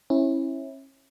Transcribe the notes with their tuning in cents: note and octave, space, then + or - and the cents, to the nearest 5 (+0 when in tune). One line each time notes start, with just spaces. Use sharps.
C#4 -35 E4 -15